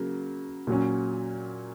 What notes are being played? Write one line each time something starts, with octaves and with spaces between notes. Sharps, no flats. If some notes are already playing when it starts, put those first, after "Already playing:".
Already playing: C#3 F#3 A#3
A#2 F#3 C#4